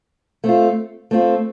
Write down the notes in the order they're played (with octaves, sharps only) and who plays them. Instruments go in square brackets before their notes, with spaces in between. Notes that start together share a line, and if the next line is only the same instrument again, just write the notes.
[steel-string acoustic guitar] A3 C4 F4
A3 C4 F4